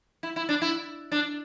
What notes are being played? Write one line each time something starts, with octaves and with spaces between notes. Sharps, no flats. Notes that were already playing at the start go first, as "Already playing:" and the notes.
E4
E4
D4
E4
D4